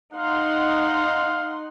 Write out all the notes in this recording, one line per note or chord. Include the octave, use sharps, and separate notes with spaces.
D#4 F5 F#5 C6